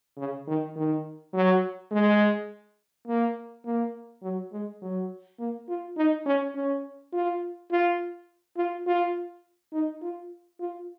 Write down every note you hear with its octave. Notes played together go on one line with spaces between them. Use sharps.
C#3
D#3
D#3
F#3
G#3
A#3
A#3
F#3
G#3
F#3
A#3
F4
D#4
C#4
C#4
F4
F4
F4
F4
D#4
F4
F4